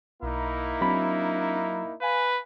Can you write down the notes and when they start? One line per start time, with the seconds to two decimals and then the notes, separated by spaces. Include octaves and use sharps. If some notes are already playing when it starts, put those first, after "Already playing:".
0.22 B1 A#3 D#4 E4
0.81 F#3 C4 D4 B5
2.01 B4 F5 G#5